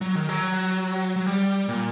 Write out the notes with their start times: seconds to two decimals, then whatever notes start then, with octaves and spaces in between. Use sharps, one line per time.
0.01 F#3
0.15 D#3
0.29 F#3
1.16 F#3
1.26 G3
1.69 A#2